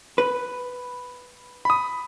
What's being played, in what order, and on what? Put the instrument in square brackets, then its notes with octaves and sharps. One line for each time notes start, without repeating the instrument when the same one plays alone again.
[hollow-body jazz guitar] B4
[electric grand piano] B5 D#6